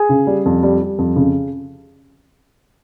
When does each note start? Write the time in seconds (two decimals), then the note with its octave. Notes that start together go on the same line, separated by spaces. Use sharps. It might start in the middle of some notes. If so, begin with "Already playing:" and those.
Already playing: G#4
0.09 C#3
0.27 G3
0.46 F2
0.63 G3
0.81 G3
0.99 F2
1.16 C#3